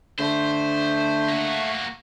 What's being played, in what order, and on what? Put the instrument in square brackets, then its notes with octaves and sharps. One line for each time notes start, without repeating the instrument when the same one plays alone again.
[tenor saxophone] D3 [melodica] A3 [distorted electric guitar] C5
[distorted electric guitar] A#3 F#4